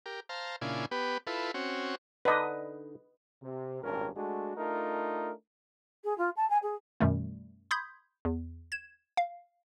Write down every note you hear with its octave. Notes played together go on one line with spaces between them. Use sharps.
G4 A#4
C5 F5 A5 A#5
A#2 C#3 D4 E4 F4 G#5
B3 G4 B4
E4 F4 A4 B4
C4 C#4 F#4
D3 D4 D#4 B4 D#5
C3
G#1 G2 A#2 C#4 A#4
G#3 A3 D4 F#4
A3 D4 D#4 F4 A#4
G#4
F4
A5
G#5
G#4
F#2 B2 D#3 G3 A3
B5 C6 D#6 G6 G#6 B6
E2
G#6 E7
F5